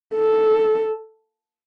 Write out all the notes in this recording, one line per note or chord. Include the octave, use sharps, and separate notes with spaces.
A4